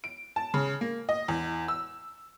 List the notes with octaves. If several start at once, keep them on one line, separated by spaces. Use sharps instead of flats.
D7
A5
C#3
A#3
D#5
E2
E6